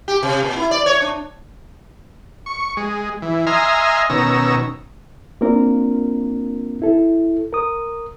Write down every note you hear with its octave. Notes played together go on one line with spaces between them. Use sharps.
G4
C3
A#2
E4
D5
C#5
D4
C#6
G#3
E3
D#5 E5 G#5 A#5 C6 F6
B2 D#3 C#4 A#5 E6
A#3 C4 D4 F4 A#4
E4 A4
A#4 D#6